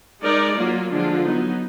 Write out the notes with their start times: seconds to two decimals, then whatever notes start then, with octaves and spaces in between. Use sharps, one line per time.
0.22 G#3 D#4 A#4 D5
0.57 F#3 A#3 F4
0.90 D3 F3 G#3 D4 F4
1.24 F#3 B3 D#4